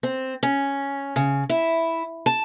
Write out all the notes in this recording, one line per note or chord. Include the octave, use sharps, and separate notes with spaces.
C4
C#4
C#3
E4
A5